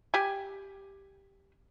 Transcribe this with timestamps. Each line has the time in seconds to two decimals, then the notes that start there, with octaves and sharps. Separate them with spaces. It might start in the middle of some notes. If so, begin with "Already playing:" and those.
0.14 G4 G#5